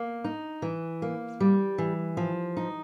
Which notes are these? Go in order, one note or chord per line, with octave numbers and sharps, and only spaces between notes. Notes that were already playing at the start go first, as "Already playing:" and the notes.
Already playing: A#3
D#4
E3
A#3
G3
E3
F3
D#4